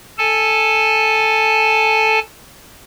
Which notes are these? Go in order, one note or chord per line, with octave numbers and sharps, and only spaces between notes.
A4 G#5 A5